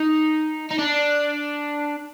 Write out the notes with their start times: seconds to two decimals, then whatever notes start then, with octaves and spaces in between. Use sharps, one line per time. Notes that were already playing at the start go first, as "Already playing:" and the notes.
Already playing: D#4
0.71 D#4
0.78 D4